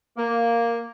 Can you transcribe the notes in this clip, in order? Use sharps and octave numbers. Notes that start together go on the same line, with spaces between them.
A#3